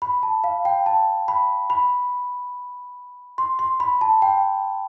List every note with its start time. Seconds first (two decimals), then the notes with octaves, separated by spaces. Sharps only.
0.02 B5
0.23 A5
0.44 F5
0.65 G5
0.86 A5
1.28 B5
1.70 B5
3.38 C6
3.59 C6
3.80 B5
4.01 A5
4.22 G5